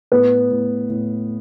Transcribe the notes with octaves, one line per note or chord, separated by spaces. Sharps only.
A2 B3 B4
A2
A2